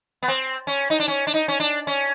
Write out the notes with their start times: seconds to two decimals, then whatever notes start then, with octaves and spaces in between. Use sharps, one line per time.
0.22 B3
0.28 C4
0.67 C#4
0.90 D#4
1.00 D4
1.08 C#4
1.27 D4
1.34 D#4
1.48 C#4
1.60 D4
1.87 C#4